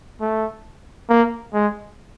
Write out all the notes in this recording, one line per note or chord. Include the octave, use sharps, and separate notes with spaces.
A3
A#3
G#3